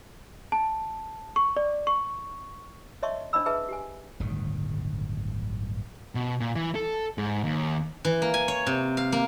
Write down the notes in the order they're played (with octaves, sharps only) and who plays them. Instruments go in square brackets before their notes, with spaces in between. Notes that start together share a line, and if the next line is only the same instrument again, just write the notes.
[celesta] A5
C#6
D5
C#6
[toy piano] C#5 D#5 E5 A5 C6 C#6
D4 C5 D#5 A5 B5 E6
G#4 B4 E5 A5
G4 G#5
[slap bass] D1 G1 B2 D#3
[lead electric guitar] B2
A#2
E3
A4
G#2
D#2
[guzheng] E3
A#3
G#5
C#5
C3
F5
A#3